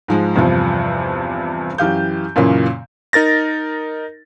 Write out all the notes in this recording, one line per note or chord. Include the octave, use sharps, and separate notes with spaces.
G#2 F3 G#3
E2 G2 C3 F3
F#2 E3 G4 F5 G6
F#2 A#2 C#3 E3 A#3
D#4 A#4 A6 A#6